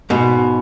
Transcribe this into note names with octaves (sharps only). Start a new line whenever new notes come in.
G#2 B2